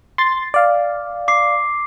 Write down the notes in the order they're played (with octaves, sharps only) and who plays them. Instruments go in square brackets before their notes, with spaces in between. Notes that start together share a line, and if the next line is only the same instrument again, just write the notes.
[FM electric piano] C6 A6
D5 F5
[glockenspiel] D6 C7